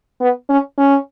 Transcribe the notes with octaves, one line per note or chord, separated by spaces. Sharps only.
B3
C#4
C#4